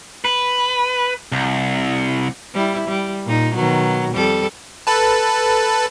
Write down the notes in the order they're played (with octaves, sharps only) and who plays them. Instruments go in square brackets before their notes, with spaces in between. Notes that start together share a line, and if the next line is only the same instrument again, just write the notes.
[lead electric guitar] B4
C2
[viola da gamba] G3 E4
G3
A#2 D#4
B2 D#3 F#3
F2 G3 A4
[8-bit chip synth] A4 B4 A5